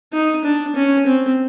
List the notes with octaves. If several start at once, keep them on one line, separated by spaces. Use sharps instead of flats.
D#4
D4
C#4
C4